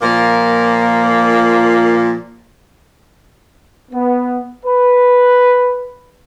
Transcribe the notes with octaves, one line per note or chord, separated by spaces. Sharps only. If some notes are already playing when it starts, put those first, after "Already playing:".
A#2 F3 A#3
B3
B4